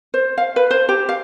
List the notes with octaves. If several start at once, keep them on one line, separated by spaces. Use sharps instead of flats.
C5
F5
B4
C5
G4
F5